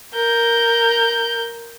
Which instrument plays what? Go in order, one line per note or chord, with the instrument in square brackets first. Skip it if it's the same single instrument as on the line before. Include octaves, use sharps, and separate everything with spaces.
[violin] A#4 G6